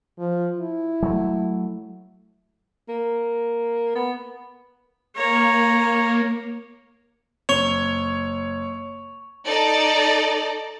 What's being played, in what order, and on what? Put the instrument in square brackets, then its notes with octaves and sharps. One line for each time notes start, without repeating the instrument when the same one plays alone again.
[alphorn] F3
E4
[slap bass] F#3 A3
[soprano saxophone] A#3
B3
[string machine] A#3 [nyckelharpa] C#5 A#5
[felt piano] F#1 [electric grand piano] C#5 [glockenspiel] C#6 F7
[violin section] D#4 A4 D5